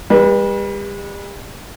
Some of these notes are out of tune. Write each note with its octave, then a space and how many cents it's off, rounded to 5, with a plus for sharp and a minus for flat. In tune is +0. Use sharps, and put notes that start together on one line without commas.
G3 +40 B4 -30